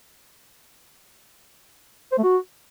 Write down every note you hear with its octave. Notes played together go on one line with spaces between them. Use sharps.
C5
A3
F#4